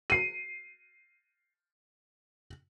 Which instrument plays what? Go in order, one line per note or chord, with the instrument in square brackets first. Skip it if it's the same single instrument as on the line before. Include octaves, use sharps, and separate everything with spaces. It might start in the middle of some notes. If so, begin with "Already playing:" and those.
[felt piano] C7 D#7